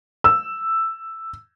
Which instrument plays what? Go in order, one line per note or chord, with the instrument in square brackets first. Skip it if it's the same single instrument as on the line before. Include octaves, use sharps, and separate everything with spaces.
[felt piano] E6